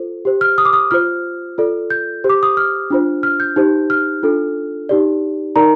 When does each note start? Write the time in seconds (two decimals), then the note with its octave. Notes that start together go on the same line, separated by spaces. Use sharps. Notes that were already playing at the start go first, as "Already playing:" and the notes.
Already playing: F4 A4 C5
0.25 G4 C5
0.41 F6
0.58 D#6
0.65 D6
0.73 D#6
0.91 F4 C5 F6
1.58 F4 A4 D5
1.90 G6
2.24 G4 C5
2.30 D6
2.43 D#6
2.57 F6
2.90 D4 F4 C5
3.23 F6
3.40 G6
3.56 D#4 G4 C5
3.90 F6
4.23 D4 F4 A4
4.89 D#4 G4 D5
5.56 D#4 A#4 D5 A#5